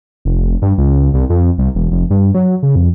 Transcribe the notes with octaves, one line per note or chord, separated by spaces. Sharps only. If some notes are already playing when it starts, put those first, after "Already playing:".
F1
G2
C#2
C2
F2
C2
E1
F1
G2
F#3
C#3
F2